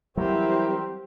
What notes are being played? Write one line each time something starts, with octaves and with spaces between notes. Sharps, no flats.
E3 F#3 G3 C4 E4 G4 A#4 C5